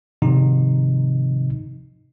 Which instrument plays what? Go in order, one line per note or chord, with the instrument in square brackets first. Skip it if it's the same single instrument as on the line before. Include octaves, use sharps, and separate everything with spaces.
[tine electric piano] G#2 C3 D#3 F3 D#4